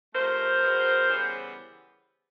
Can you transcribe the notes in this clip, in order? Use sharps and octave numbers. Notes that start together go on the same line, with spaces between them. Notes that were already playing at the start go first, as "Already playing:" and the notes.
C3 F3 A3 A#4 C5
B2 G#3 B3
C#3 E3 G3 B3